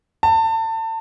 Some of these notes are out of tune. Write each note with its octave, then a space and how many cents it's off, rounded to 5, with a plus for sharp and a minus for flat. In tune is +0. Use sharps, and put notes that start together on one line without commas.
A5 +30